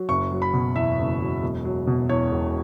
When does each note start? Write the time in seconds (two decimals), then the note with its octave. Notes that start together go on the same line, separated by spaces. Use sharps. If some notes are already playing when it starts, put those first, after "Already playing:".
Already playing: F#3
0.09 F#1 C#6
0.31 F#3
0.42 B5
0.53 B2
0.76 E2 E5
0.99 F#1
1.20 F#3
1.43 E1
1.65 F#3
1.87 B2
2.09 E2 C#5
2.32 E1